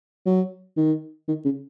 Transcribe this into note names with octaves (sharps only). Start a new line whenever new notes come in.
F#3
D#3
D#3
C#3